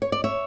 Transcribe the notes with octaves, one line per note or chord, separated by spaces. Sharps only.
C#5
D5
C#5 E5